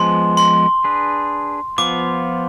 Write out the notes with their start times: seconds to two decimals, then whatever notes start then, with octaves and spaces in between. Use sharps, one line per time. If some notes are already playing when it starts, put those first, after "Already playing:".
Already playing: F3 G#3 B3 C6
0.37 C6
0.84 D4 G#4 B4
1.78 F3 B3 F4 D6